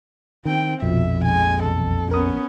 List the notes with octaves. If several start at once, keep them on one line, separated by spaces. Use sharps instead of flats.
D#3 C4 G5
A#1 F2 B2 F3 E5
G#3 G#5
B1 E2 A4
B3 C#4 A#4 D#6